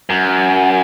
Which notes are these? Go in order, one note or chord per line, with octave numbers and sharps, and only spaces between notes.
F#2